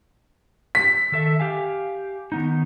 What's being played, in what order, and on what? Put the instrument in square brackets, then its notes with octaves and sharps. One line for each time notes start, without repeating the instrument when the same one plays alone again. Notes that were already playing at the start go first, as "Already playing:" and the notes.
[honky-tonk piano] B6
[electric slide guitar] D#3 A4 E5
G4 F5 G#5
D#3 B3 D#4